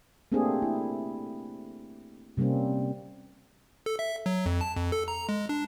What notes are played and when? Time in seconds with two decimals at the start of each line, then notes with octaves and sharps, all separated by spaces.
0.32 A3 A#3 C4 D4 G4 G#4
0.62 E4
2.37 C3 G3 A#3 C4 C#4
3.86 A4
3.99 E5
4.26 F#3
4.46 F2
4.61 A5
4.76 F2
4.92 A4
5.08 A#5
5.29 G#3
5.49 D4